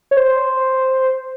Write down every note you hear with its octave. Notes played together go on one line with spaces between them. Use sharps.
C#5
C5